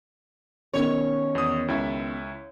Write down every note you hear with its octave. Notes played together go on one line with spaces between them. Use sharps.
B2 D#3 C#4 C#5
E2 D#6
C#2 E4 E5